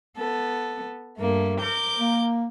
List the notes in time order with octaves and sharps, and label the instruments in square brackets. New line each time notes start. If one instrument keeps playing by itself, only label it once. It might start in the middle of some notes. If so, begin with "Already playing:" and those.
[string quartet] B3 A4
G2 A3 A#3
A#4 D6 G6
[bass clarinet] A#3